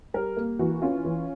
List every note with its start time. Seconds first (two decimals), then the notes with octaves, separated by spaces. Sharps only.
0.14 G3 A#4
0.37 A#3
0.59 E3 F#4
0.82 C#4 F4
1.05 E3